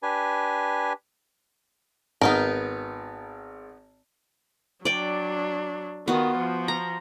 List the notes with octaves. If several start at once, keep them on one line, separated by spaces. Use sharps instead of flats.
D4 G4 B4 G#5
G#1 B3 D#4 A#4
F#3 D4 D5 G5
D#3 B3 F4 F#4
F3
A#5